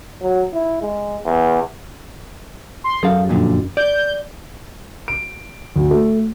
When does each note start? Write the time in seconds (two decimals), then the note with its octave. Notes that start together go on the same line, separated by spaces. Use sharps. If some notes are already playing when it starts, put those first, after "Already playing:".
0.21 F#3
0.53 E4
0.82 G#3
1.25 E2
2.84 C6
3.03 F#2 G#4 A4 F5
3.29 F2 A#2 D3
3.77 D5 G6
5.08 D7
5.76 D2
5.91 A3